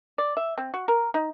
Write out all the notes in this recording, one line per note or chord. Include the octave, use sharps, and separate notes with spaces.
D5
E5
C4
F#4
A#4
D#4